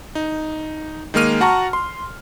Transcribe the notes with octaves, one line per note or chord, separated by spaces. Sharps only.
D#4
D#3 G#3 A#3 F6 D#7
F#4 F#5 A5 A#5 C#6
C6